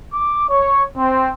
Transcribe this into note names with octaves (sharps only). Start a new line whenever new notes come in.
D6
C#5
C4